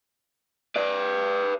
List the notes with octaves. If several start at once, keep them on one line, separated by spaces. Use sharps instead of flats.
B4 D5